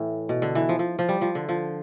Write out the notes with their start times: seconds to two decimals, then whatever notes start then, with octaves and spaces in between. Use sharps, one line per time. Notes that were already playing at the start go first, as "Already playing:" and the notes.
Already playing: A2 E3
0.29 B2
0.42 D3
0.55 E3
0.69 F3
0.79 F3
0.99 F3
1.09 G3
1.21 F3
1.35 D3
1.49 F3